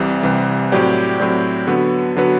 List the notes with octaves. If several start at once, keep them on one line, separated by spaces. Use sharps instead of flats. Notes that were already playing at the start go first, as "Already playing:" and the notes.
Already playing: C2 C3 E3 G3
C2 C3 E3 G3
A2 F#3 C4 G4 D5
A2 F#3 C4 G4 D5
D3 F#3 B3 F#4 B4
D3 F#3 B3 F#4 B4